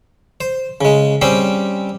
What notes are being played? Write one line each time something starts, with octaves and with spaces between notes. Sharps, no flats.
C5
C#3 G#3
G3 C4 C#4 G4 C5